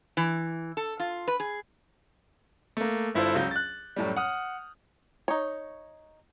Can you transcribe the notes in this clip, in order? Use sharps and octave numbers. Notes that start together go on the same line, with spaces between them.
E3
A4
F4
B4
G#4
A3 A#3
G1 G2 E4 F4 A4 C5
C#2 F#3 G6
F#6 A6
F#2 A2 G3
F#5 D#6 F6
D#4 C#5